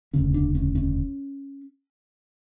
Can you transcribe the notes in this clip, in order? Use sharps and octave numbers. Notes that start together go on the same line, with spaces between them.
E1 D2 C#3 C#4
D4
C#4
C#4